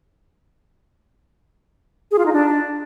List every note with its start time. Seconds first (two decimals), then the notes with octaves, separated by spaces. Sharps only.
2.11 G#4
2.19 F4
2.26 D#4
2.33 D4